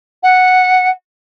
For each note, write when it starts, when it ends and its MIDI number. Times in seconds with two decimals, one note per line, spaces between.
0.23 0.89 78